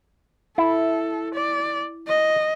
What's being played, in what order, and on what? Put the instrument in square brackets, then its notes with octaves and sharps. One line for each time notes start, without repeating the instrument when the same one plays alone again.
[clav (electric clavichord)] E4 [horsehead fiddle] A4
[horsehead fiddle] D5
D#5